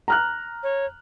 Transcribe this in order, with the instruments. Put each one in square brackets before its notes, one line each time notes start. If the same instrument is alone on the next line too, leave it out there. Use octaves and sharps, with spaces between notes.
[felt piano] A#5 F6 F#6
[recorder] C#5